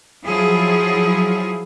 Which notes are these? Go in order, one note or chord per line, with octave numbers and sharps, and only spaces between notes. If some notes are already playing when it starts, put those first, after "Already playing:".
F3 F#3 E4 F4 G#4